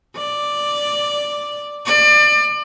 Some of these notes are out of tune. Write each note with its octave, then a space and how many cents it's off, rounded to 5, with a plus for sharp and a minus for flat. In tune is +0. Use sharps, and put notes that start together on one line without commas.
D5 +0
D5 +30